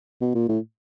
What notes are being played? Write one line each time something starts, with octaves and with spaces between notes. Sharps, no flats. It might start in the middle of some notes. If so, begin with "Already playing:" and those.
B2
A#2
A2